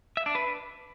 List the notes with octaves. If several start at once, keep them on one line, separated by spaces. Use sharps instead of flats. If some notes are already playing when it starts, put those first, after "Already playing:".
E5
D4
B4